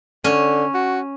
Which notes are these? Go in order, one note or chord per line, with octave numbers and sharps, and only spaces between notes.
D3 C#4
F#4